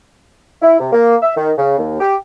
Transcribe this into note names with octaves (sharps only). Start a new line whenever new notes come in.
E4
C3
A#3
E5
D#3
C#3
D#2
G4